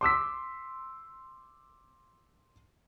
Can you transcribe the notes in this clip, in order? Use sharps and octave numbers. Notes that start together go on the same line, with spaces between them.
C6 D6 E6 B6